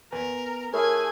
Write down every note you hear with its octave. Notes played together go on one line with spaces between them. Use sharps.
B3 A#4 B4 G#5
A3 E4 G#4 A#4 C#5 G#5